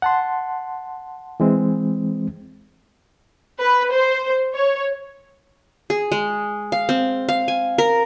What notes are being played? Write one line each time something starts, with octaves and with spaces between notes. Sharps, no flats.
F#5 A5 C6
E3 G#3 C4
B4
C5
C#5
G#4
G#3
F5
C4
F5
G#5
A#4